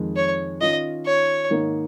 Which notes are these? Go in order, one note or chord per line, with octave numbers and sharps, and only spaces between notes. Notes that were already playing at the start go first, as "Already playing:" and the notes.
Already playing: F2 D#3 G#3
C#5
D#3 C#4 F4 D#5
C#5
G#2 D#3 A#3 D#4